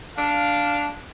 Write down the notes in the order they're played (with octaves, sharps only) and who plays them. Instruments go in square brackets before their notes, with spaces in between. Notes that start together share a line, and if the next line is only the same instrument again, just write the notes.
[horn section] D4 F5